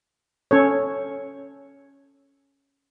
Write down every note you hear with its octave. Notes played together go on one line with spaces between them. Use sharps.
C#4 A4 C#5